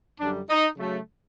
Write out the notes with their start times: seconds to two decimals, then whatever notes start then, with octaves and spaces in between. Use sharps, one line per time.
0.20 F#2 D3 G3 D4
0.49 D#4
0.78 C#3 F#3 A3